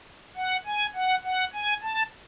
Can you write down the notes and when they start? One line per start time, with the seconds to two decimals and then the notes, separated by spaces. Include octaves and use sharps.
0.36 F#5
0.66 G#5
0.95 F#5
1.24 F#5
1.53 G#5
1.83 A5